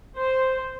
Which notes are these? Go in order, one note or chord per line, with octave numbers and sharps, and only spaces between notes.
C5